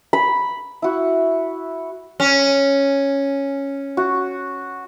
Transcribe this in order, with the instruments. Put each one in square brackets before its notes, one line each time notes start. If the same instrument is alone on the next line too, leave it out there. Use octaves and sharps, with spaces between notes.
[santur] B5
E4 F#4
[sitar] C#4
[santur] F#4